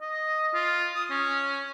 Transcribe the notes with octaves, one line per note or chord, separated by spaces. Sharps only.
D#5
F4
D#6
C#4